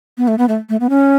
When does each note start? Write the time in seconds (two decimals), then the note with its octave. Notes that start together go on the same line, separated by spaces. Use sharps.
0.18 B3
0.28 A3
0.38 B3
0.48 A3
0.69 A3
0.80 B3
0.90 C#4